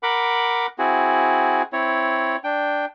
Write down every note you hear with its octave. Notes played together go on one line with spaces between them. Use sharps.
A#4 F#5 B5 D6
C4 E4 F#4 G#4
C4 E4 C#5
D4 G5